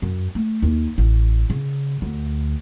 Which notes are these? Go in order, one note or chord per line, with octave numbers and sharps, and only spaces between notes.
F#2
A3
D#2
A1
C#3
D2